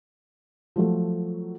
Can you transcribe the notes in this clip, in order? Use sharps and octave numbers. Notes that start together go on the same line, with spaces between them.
F3 F#3 A3